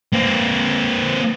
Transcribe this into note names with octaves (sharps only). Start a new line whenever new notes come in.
A#3 C4